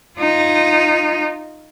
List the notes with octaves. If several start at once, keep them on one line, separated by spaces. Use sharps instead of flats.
D#4 F4